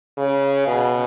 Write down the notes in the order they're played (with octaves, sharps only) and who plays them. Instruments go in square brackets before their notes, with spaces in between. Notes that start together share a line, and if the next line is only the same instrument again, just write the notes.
[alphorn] C#3
B2